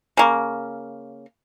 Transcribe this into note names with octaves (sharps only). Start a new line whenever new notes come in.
C#3 A#3